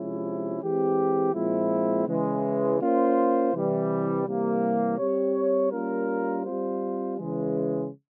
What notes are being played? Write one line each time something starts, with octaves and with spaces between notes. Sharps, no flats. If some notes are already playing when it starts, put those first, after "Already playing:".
Already playing: C3 F3 G#3 C#4 E4
E3 G#3 C4 G4
A#2 F3 G#3 C4 E4
C#3 E3 G#3
A#3 C#4 F4 C5
C3 E3 G3
C3 E3 G3 A#3
G3 C4 G4 C#5
G3 A#3 C#4 F4 A#4
G3 C4 F4 C5
C#3 E3 G#3